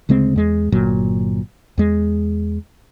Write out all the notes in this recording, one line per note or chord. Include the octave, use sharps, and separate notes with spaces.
D2 C#3 G#3 C4
E2 G#3
G1 A#2 F#3
E2 G#3